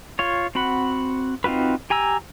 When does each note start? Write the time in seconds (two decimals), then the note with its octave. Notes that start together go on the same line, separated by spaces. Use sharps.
0.19 F4 C#5
0.55 C4 F#4 F#5 B5
1.44 C4 D#4 F4 F#4 B4
1.90 G4 G#5 A#5 E6